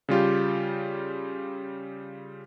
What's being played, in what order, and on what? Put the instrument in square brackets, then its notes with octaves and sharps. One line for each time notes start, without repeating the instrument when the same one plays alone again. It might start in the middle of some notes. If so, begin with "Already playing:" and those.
[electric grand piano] C#3 G3 F4 G4